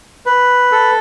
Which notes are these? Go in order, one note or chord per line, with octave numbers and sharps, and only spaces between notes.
B4
A4